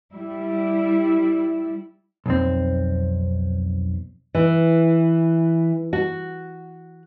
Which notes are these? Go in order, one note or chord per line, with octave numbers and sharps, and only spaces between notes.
G3 E4
B1 F2 C4
E3
F#4